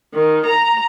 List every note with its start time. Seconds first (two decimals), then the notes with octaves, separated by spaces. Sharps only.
0.14 D#3
0.46 A#5